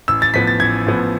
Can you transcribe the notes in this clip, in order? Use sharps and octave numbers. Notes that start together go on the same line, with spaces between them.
A1 E6
A6
A2 F3 B3 B6
A6
A1 G#6
A2 F3 B3